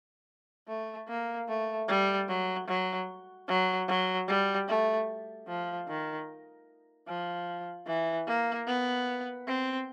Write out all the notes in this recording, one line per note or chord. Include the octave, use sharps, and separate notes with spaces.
A3
A#3
A3
G3
F#3
F#3
F#3
F#3
G3
A3
F3
D#3
F3
E3
A#3
B3
C4